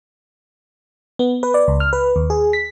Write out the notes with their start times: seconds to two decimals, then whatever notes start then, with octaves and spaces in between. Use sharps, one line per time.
1.19 B3
1.43 B4
1.54 D5
1.68 C#2
1.80 F6
1.93 B4
2.16 D#2
2.30 G#4
2.53 B6